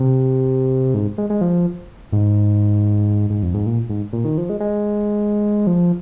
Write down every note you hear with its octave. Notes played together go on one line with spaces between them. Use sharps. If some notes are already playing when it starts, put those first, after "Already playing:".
Already playing: C3
G#2
G#3
G#3
F3
G#2
G#2
F2
G#2
A#2
G#2
A#2
D#3
F3
G#3
G#3
F3